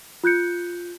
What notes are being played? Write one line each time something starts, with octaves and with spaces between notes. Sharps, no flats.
F4 F#6 G6 C#7